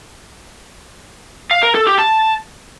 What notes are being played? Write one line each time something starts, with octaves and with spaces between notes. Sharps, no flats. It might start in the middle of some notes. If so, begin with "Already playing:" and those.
F5
A#4
A4
G4
A5